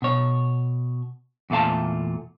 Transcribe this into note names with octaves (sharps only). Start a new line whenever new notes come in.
B2 C#5
E2 A#2 A3 F5 A5